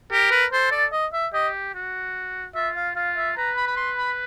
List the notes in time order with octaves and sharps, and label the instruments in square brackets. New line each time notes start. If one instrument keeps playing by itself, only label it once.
[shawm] G4 [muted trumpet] A#4
[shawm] B4
[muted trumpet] A4 [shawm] C5
[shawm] D5
D#5
E5
[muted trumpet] G4 [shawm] D#5
[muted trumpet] F#4
[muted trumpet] F4 [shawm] E5
[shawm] F5
[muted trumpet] F4 [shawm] F5
[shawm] E5
[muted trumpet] B4 [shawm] A#5
[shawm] B5
B5
C6
B5